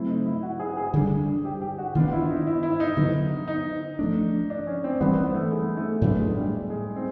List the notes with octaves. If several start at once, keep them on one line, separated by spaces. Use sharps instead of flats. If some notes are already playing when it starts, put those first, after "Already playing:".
Already playing: C#3 F#3 A3 C4 E4
D#4
E4
F#4
G#4
G#4
D3 G3 A#3 D4
G4
G4
F#4
D#3 G#3 B3 D4 F4
E4
D#4
E4
E4
D#4
D3 F#3 B3
D#4
F3 A3 D4
D4
C#4
C4
E3 G3 B3 C4
B3
A3
G#3
A3
A2 F#3 A3 B3 D4
G#3
G3
G#3
C4